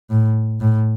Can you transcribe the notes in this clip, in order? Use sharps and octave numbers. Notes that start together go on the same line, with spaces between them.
A2
A2